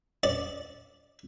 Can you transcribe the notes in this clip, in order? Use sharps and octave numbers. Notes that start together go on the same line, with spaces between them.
D5